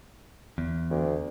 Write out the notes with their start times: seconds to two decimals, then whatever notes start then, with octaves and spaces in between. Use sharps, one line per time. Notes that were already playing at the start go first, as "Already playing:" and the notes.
0.58 E2
0.90 D2